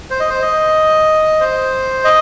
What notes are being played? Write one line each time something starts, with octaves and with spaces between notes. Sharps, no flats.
C5
D#5
C5
D#5
C5
D#5